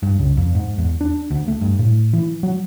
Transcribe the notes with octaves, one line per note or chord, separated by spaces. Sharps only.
G2
C#2
F2
G#2
E2
D4
D2
A3
G2
A2
E3
F#3